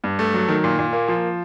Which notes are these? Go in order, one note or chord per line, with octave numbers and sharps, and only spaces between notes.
G2
A3
F#3
D#3
A#2
A#2
A#3
F3